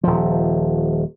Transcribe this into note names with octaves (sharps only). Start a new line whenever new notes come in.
D#1 F3